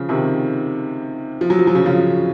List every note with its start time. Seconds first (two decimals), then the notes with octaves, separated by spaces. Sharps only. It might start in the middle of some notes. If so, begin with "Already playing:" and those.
Already playing: C#3 F3
0.09 C3 D#3
1.41 F3
1.50 F#3
1.59 F3
1.67 F#3
1.75 C#3 F3
1.86 C#3 F3